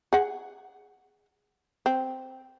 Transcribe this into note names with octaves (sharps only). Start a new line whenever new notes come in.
G#4 F#5
C4